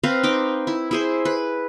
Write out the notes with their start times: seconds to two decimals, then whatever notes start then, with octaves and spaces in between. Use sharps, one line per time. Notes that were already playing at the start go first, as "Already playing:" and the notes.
0.03 C4 B4 F5 A#5
0.23 D#4 G5 D6
0.67 E4
0.91 E4 G#4 C5
1.25 B4